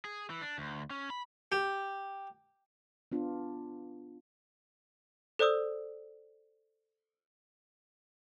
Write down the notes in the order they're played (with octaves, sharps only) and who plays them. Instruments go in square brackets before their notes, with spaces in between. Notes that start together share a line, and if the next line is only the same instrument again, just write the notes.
[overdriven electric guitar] G#4
E3
D4
D2
C#4
B5
[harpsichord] G4
[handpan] B3 D4 F4
[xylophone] A4 C5 D5 D#6 E6